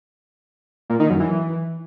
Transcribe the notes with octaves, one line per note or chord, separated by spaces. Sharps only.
A#2
D#3
F#2
E3